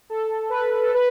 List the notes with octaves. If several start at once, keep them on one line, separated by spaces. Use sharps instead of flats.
A4
B4
B4
A4
B4